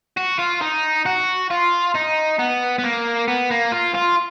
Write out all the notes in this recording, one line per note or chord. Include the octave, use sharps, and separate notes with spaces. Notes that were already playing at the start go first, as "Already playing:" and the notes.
F#4
F4
D#4
F#4
F4
D#4
B3
B3
A#3
B3
A#3
F4
F4